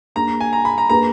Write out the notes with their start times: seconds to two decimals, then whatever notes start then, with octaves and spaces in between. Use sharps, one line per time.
0.16 A#3 D4 G#4 A#5
0.41 G#5
0.53 A#5
0.65 B5
0.78 A#5
0.90 A#3 D4 G#4 B4 A#5